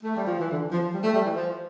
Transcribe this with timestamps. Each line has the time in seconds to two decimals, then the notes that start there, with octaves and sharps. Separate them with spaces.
0.04 A3
0.16 G3
0.26 F3
0.38 E3
0.50 D3
0.72 F3
0.93 G3
1.03 A3
1.13 G3
1.25 E3
1.35 F3